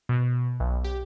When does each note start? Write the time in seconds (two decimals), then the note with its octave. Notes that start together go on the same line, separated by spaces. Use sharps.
0.09 B2
0.60 B1
0.84 G4